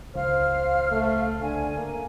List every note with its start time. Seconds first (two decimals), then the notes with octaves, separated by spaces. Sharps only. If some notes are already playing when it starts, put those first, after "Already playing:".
0.15 C#2 C5 F5 F6
0.91 A3
1.41 D3 G#5
1.77 A#3